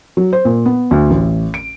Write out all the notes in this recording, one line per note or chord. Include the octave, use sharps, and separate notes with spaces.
F#3
C5
A#2
B3
D2
A1
D7